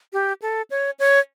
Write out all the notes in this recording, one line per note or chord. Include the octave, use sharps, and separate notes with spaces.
G4
A4
C#5
C#5